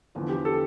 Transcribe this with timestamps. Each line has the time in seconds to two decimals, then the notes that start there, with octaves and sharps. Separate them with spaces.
0.15 E2 D3 F3
0.29 G4
0.45 A4